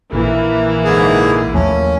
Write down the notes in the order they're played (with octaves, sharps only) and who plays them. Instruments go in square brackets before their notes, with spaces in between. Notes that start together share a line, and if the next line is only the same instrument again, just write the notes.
[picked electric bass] A#1 A#2 [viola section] E3 A#3 E4
[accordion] G#2 D3 G#4
[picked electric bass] D#2 F3 A3 [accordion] C#4